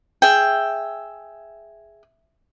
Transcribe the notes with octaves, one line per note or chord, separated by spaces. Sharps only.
G#4 E5 G5